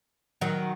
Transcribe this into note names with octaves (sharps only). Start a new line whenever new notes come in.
D#3 F#3